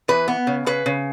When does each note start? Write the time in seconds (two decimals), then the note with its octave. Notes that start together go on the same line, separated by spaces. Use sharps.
0.08 E3 B4
0.28 B3
0.47 C#3
0.66 C#3 B4
0.86 C#3